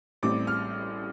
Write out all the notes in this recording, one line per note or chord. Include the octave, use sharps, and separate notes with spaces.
A1 A2 G3 C4 D6
F6